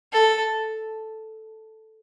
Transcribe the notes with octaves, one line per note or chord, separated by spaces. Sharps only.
A4